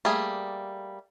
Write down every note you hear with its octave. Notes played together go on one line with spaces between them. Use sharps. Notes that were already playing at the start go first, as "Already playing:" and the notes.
G3 A3 A#3 G#4